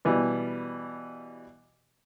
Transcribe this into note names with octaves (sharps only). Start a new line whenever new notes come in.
B2 E3 G3